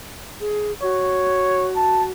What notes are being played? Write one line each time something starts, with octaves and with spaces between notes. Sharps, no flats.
G#4
F#4 C#5
A5